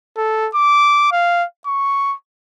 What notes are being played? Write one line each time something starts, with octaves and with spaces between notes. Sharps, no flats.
A4
D6
F5
C#6